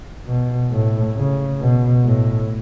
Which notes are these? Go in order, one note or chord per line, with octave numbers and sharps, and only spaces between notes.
B2
A2
C#3
B2
A2